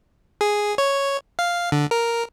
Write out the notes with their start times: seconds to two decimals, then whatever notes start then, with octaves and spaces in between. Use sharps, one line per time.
0.41 G#4
0.78 C#5
1.39 F5
1.72 D3
1.91 A#4